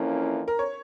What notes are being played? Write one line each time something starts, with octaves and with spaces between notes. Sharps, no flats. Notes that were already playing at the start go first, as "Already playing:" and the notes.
Already playing: F2 E3 A#3 C#4 E4
A#4
C#5